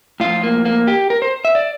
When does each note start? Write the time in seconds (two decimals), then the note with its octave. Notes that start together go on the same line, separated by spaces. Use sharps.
0.20 A2 F3 F4
0.43 A#3
0.65 A#3
0.87 G4
1.10 A#4
1.22 C5
1.45 E5
1.55 D5